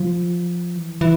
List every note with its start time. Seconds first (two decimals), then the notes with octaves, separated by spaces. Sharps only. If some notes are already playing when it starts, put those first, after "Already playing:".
Already playing: F3
0.75 E3
1.01 E3